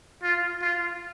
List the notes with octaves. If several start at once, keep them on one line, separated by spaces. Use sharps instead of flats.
F4
F4